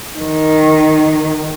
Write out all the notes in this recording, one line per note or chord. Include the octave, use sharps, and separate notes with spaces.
D#3